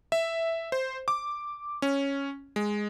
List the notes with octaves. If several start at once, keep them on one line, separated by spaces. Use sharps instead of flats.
E5
C5
D6
C#4
G#3